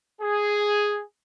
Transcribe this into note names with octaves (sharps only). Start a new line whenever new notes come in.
G#4